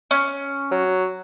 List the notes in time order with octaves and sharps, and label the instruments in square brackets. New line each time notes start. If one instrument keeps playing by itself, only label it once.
[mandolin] C#4
[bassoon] F#3